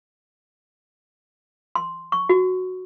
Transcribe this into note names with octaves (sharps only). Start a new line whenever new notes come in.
C6
C#6
F#4